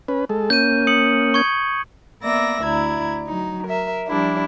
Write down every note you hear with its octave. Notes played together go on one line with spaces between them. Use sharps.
C#4 B4
G#3 A4
A#3 C#4 G6 D#7
D#6 C#7 F#7
C#6 G#6
A#3 B3 D5 E5 D6 A#6
D2 E4 D5 A#5 G#6
F#3 D#4
A#4 E5
F3 G3 D4 E4